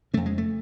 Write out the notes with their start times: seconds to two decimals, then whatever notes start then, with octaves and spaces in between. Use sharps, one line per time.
0.14 F2 C#3 A3
0.26 G#3
0.38 A3